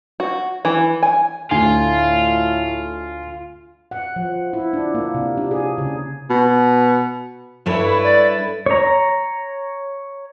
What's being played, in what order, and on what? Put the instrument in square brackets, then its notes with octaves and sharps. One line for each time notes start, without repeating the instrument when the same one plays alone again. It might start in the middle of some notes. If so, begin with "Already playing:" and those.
[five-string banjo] F#4
E3
G#5
[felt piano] D2 D3 [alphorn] A2 [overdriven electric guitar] F4 [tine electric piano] G#5
[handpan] F#5
F3
E4
D4
A#3
C3
D4
G#4
C#3
[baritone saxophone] B2
[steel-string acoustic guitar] G2 A4 C#5 [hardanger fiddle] E4 B4
[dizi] D5
[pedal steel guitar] C#5 A#5